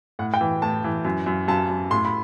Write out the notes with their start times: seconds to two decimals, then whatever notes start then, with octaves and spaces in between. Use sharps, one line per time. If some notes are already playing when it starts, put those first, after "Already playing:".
0.19 A2 F#5
0.34 G5
0.41 E3
0.62 A2 A5
0.84 E3
1.05 F#2
1.26 F#2
1.48 F#2 A5
1.70 F#2
1.91 A2 C6
2.05 B5